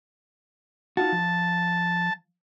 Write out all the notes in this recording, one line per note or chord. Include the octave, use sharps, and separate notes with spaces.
D#4 F4 F#4 A5
F3